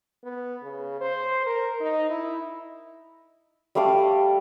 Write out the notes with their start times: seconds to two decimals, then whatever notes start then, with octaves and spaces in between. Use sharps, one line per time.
0.24 B3
0.63 C#3
1.01 C5
1.46 A#4
1.81 D#4
2.10 E4
3.75 G3 A3 F5 D6